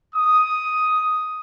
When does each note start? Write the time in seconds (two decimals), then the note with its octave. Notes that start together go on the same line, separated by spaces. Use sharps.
0.14 D#6